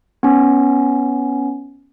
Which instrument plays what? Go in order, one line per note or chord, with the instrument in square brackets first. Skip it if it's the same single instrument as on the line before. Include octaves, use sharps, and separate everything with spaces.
[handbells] B3 C#4